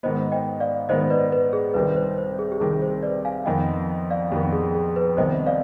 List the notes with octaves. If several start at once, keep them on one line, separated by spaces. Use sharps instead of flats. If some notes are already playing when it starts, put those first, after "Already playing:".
G#2 D#3 B3 C5 D#5
D#5 G5
D5 F5
G#2 D#3 B3 C5 D#5
B4 D5
B4
G#4
C2 C3 D#3 G3 C4 B4
B4
C5
C5
G#4
G4
C2 C3 D#3 G3 C4 G#4
C5
B4 D5
F5 G#5
F2 D#3 B3 D#5 G5
D5 F5
F2 D#3 B3 G4
G#4
G#4
B4
C2 C3 D#3 B3 D#4 C5 D#5
D5 F5